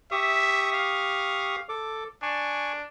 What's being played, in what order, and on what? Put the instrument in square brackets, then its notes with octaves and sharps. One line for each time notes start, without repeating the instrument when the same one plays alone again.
[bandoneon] G4 C#6 D#6 [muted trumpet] E5
[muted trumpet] F5
[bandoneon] A4 D6
[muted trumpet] D4 [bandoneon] G#5 C#6